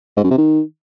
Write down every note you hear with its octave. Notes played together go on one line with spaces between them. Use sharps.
G#2
F#2
C3
D#3